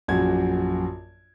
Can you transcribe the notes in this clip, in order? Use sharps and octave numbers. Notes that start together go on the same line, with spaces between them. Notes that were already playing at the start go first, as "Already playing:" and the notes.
A#1 F#2 F#4 G#6